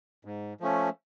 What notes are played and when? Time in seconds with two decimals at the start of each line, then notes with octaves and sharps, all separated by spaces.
0.25 G#2
0.60 F3 A3 C#4